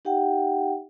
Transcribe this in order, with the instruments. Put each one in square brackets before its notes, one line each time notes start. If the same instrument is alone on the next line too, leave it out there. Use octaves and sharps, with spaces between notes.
[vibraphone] D#4 G4 E5 F#5 G5